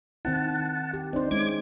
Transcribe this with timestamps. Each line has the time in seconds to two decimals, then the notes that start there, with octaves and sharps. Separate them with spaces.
0.25 D#3 C4 E4 F#5 A5
0.93 G4
1.13 C4 D4 D#4 C5
1.31 G#3 C#4 E4 D6 G#6